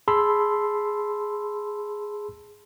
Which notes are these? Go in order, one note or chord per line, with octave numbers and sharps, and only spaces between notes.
G#4 A5 B5 C6 E6